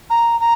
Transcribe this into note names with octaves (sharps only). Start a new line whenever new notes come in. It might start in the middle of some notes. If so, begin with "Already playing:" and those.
A#5
A#5